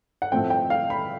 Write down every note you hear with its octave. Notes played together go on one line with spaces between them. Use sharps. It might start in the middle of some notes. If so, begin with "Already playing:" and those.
F#5
A2 F3 A3 C4 G5
G5
F5
B5